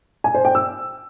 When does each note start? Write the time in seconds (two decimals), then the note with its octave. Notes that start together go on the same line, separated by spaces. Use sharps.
0.24 G#5
0.35 C5
0.45 G5
0.55 E6